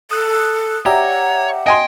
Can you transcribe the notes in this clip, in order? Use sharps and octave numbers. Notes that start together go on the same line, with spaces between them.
A4 D#6 F#6
G4 C#5 D5 E5 F#5 A#5
D#5 G5 G#5 C6